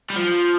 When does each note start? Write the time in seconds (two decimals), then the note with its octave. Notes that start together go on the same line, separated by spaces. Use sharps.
0.10 G3
0.16 F3